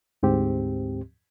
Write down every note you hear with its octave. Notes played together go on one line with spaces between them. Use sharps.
D2 G#2 C4 G4